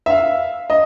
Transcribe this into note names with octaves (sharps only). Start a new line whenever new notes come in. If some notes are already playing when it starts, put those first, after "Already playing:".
E5
F5
D#5